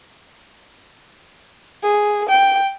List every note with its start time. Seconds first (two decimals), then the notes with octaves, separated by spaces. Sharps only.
1.83 G#4
2.29 G5